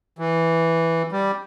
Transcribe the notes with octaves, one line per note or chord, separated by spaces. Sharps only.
E3
G3